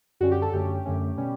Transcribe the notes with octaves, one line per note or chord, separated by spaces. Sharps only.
F#2 D3 G3 C#4 F#4
G4
A4
F#2 D3 A3 C#4 G4
F#2 D3 A3 C#4
B2 G3 C#4